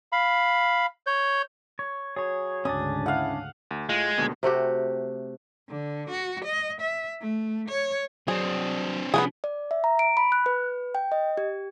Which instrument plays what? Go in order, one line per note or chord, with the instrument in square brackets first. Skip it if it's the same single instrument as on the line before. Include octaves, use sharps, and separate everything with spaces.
[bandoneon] F5 B5
C#5 G6
[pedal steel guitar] C#5
[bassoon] F#3 [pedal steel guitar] G#4 C#5
[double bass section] D2 G#2 C#3 [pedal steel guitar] C#4 D4 D5 [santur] D#6
[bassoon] E4 [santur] F5 F#5
[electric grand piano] D2
[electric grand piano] A2 F4 F5 [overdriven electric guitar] G#3
[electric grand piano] D#2 B2 D3
[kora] C3 A3 F#4 G4
[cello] D3
F#4
D#5
E5
A3
C#5
[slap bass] F#3 [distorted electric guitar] C4 D4 [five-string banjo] G#4
[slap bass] C3 F3 [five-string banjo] B3 F#4 G#4
[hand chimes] D5
E5
A#5
D7
B5
F#6
B4
G5
D#5
G4